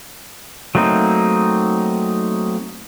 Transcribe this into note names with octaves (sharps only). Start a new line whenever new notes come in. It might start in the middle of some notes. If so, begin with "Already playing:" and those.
F#3 A3 A#3 C4 D#4